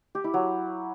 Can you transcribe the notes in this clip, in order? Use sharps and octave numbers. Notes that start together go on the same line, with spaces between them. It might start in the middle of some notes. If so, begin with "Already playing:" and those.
G4
E4
F#3